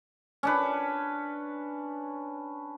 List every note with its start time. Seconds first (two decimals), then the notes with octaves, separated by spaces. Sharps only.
0.43 C#4 D4 B4